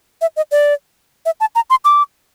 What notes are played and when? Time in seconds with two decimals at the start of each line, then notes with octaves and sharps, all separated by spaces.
0.21 E5
0.36 D#5
0.51 D5
1.25 E5
1.40 A5
1.55 A#5
1.70 C6
1.85 D6